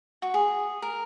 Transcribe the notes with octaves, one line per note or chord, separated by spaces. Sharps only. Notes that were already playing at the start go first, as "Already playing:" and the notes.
F#4
G#4
A#4